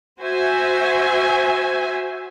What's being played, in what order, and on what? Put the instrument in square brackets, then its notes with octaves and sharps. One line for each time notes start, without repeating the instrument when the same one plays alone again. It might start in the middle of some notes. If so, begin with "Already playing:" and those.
[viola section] F#4 C5 E5 G#5